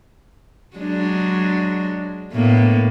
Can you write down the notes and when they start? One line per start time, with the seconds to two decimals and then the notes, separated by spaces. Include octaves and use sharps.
0.76 F#3 G#3 D4
2.32 A2 A#3 B3